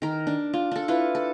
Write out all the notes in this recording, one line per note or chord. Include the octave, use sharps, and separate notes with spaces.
D#3 A#4
D4
F4
D4 A4
E4 F4 B4
A4